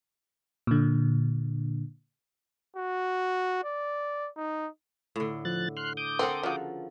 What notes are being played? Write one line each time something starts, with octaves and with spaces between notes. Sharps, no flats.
A#2 D3
F#4
D5
D#4
A2 D3
F3 F#6 A6
C6 F6 F#6
D6 D#6 G6
C4 A4 A#4 F#5
C#3 F3 F#4